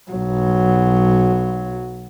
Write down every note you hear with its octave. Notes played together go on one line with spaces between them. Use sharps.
B1 F#3